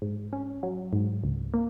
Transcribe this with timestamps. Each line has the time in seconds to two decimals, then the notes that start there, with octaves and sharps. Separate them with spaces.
0.02 G#2
0.33 C#4
0.63 F#3
0.93 G#2
1.24 C#2
1.54 A#3